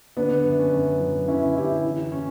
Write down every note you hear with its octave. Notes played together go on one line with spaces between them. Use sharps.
D3 B3 D4
F#2
C#4
F#2
F#3
D3 C#4 E4
F#2 E4 G4
E3
C#4